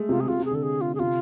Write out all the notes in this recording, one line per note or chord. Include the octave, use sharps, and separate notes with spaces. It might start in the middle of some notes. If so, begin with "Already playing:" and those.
Already playing: G#3 A3
C3 F4
G#4
C3 F4
C3
G#4
D3 A4
G#4
F4
G#4
C3 F4